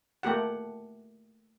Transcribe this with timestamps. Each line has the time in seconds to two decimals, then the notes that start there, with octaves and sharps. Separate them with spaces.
0.23 A3 A#3 G4 F#5